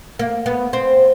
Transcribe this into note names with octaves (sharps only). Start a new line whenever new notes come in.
A#3
B3
C4